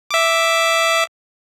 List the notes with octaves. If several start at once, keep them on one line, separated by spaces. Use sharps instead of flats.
E5 D6